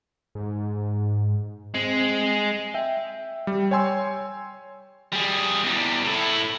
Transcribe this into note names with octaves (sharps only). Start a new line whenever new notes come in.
G#2
G#3 C4
E5 G5
G3
C#5 G5 G#5 C6 E6
G3 G#4
E2 G3
A2 E4